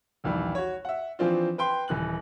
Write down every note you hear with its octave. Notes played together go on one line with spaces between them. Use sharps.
A#1 D#2 E3 G3
F#4 C#5
E5 F#5
E3 F3 C4 D4 F4
B4 G5 C6
D#1 E3 F#6 F#7